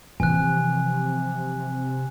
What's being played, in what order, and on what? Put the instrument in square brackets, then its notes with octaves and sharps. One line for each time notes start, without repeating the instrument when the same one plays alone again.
[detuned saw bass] C3 [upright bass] E3 F3 [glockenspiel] G#5 F#6